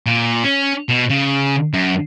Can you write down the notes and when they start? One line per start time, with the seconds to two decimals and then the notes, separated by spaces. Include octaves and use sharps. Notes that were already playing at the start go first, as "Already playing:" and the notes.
0.06 A#2
0.44 C#4
0.89 B2
1.10 C#3
1.74 F#2